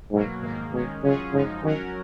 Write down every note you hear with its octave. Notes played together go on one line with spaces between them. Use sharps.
G#2 B2 F#3 A#3
G#2 D#3 A#3
B2 D#3 G#3 C#4
C#3 F#3 C#4 F4 G#4
F#2 C#3 F3 G#3 D#4
D#3 F#3 C#4 F#4 A#4